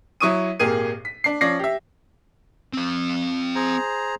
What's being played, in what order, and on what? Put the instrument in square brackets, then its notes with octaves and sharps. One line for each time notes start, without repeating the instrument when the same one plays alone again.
[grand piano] F#3 E4 C#6 D#6 D#7
G#1 A#2 A#3 G4 G#4 D#7
B6
D4 C7
F3 C#4 D5 A#6 C7
G4 E5
[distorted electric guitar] C4 F5
[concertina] G#4 C5 A#5